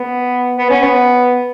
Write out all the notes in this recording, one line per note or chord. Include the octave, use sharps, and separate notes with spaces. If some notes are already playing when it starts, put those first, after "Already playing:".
Already playing: B3
B3
C#4
B3